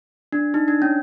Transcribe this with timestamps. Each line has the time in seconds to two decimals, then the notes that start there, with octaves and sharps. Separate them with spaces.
0.32 D4
0.54 D#4
0.68 D4
0.82 C#4